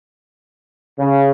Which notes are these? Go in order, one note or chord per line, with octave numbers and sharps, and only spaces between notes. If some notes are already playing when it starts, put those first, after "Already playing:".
C#3